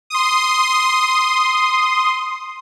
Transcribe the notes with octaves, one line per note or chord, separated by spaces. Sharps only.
C6 D#6